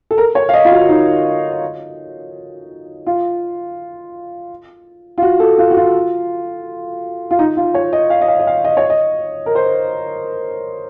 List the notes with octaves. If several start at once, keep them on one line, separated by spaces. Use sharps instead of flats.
A4
A#4
C#5
F5
D#5
F4
F#4
D#4
F4
F4
F#4
A4
F4
F#4
F4
F4
D#4
F4
C#5
D#5
F5
D#5
F5
D#5
F5
D#5
C#5
D#5
A#4
C5